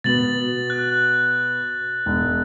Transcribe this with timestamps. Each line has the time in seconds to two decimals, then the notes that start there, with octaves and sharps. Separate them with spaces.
0.04 B2 B3 F#4 A6 F#7
0.70 F#6
2.06 E1